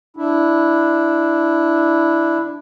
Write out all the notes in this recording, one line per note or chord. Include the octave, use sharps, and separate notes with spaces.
D4 E4